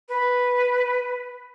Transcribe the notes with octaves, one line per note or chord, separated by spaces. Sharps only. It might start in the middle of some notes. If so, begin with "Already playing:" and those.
B4